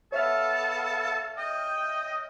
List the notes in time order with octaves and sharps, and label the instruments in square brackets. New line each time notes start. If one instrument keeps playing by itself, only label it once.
[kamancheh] B3 F5 [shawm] A4 [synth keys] C#5 E5 F6
[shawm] D#5 [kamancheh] G5